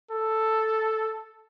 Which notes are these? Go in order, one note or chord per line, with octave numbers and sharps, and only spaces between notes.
A4